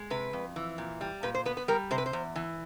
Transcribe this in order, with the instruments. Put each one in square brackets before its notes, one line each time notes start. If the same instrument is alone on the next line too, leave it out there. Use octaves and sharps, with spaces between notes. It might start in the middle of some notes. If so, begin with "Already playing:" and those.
Already playing: [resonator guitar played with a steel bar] G#3
C3 B4
F2
E3
A#2
G3
A#2 B4
C5
B3 B4
B4
G3 A#4
C3 C5
B4
C5
E2
E3